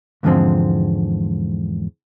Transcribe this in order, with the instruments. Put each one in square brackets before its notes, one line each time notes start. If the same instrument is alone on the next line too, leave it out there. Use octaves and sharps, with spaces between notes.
[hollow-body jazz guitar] E2 G#2 D3 F3 G#3 C4